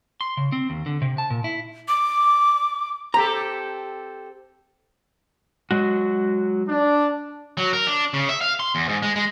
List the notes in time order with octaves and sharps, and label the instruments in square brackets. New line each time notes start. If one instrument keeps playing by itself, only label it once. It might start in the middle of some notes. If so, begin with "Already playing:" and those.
[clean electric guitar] C6
C#3
C4
D#2
D3
C3
A5
A#2
E4
[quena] D6
[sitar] C4 G4 A4 [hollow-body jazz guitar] A#5
[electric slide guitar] F#3 G#3 F#4
[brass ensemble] D4
[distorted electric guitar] F#3
A#4
D4
C#3
E5
F5
C6
E2
G#2
G#3
G#3